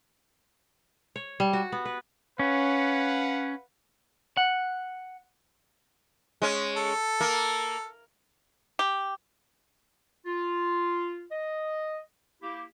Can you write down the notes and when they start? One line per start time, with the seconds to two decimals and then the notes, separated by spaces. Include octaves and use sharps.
1.16 C#5
1.40 G3
1.53 F#4
1.72 B3
1.85 B4
2.39 C#4 B4 F5 F#5
4.37 F#5
6.42 G#3 C#4
6.77 A4
7.21 A#3
8.79 G4
10.26 F4
11.31 D#5
12.42 A#3 E4 G4